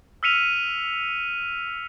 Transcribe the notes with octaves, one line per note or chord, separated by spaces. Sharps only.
E6 F6 B6 C#7 D#7 F7